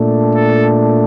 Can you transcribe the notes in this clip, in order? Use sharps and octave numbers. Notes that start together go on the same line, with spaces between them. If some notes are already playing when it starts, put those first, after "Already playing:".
Already playing: A#2 A3 D4
A4